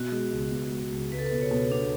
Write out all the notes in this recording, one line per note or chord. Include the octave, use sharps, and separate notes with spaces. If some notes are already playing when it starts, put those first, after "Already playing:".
Already playing: B2 F#4
G#3
C#2
B3
G#3
C#2
C#2 B4
A4
B4
B2
C#5
B2
B3 D4